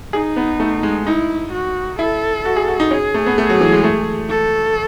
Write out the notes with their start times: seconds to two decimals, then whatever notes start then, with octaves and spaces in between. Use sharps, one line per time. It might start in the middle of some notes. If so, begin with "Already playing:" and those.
0.13 D#4 G#4
0.36 B3
0.60 A3
0.83 G#3
1.06 D#4 E4
1.52 F#4
1.99 E4 A4
2.45 F#4
2.56 G#4
2.68 F#4
2.80 D#4
2.91 C#4 G#4
3.14 A3
3.26 B3
3.38 A3
3.49 F#3
3.61 E3
3.72 G#3
3.84 A3
4.30 A4